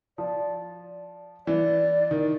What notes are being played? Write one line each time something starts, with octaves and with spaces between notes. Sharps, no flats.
F3 D5
E3 D5
D#3